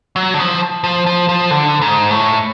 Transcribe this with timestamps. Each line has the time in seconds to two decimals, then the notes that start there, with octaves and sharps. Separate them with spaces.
0.16 F#3
0.34 D3
0.39 F3
0.84 F3
1.06 F3
1.29 F3
1.51 D3
1.82 G#2
2.11 A2